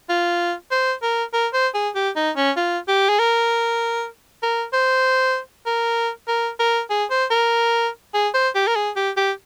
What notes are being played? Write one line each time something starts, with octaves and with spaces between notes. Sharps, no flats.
F4
C5
A#4
A#4
C5
G#4
G4
D#4
C#4
F4
G4
G#4
A#4
A#4
C5
A#4
A#4
A#4
G#4
C5
A#4
G#4
C5
G4
A#4
G#4
G4
G4